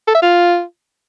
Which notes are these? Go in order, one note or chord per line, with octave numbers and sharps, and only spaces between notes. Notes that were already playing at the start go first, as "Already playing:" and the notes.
A4
E5
F4